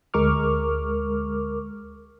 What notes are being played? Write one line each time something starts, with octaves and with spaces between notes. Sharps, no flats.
D2 G#3 A#4 C#6 D6 F6